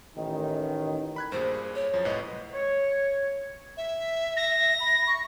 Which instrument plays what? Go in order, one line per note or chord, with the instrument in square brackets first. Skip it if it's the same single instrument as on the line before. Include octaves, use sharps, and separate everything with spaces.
[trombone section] A1 D#3
[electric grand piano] B5 F#6 G#6
[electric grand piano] G2 A#2 G#4 [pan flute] C5
[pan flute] C#5
[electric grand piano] F#2 F3
[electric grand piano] C2 A2 B4 [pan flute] D#5
[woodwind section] C#5
[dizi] E5
[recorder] A#6
[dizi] B5
C#6